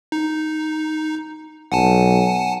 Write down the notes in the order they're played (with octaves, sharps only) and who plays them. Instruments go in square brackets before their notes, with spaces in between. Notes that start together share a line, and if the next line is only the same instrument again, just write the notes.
[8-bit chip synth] D#4
[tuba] B1 [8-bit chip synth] F#5 G#5 A5